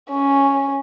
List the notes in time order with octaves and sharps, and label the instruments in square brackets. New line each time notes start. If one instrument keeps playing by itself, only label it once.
[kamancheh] C#4